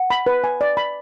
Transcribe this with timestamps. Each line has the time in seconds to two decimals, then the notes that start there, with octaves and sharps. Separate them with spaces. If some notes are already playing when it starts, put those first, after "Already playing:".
Already playing: F#5
0.10 B5
0.26 B4
0.44 G#5
0.61 D5
0.77 B5